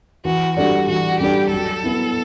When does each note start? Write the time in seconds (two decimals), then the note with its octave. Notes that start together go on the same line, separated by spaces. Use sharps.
0.25 E3 F#4
0.56 G3 D4 F#4 A4 D5
0.88 E3 F#4
1.20 G3 D4 G4 A4 D5
1.52 F#3 A4
1.84 B3 E4